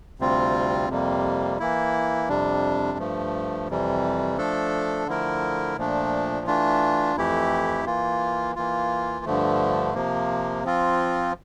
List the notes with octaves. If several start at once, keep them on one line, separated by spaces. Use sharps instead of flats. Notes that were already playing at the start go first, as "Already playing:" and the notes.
D2 C3 G3 C4 F4
F2 C3 G3 A#3
E3 A#3 E4
F2 C3 G3 D4
G2 F3 A3
F2 C3 E3 G3
F3 A3 D4 A4
D3 F3 A3 E4 A#4
A#2 F3 A3 D4
E3 A3 D4 F4
F2 E3 A3 E4 G4
E3 A#3 F4
E3 A#3 F4
G2 D3 F3 A3
C3 F3 A#3
F3 C4 F4